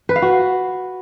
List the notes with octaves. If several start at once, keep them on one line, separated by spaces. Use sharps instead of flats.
B4
F5
F#4